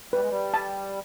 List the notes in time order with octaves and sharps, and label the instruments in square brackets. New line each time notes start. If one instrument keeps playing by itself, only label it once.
[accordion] G3 [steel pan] B4
[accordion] G#3
G3
[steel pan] A5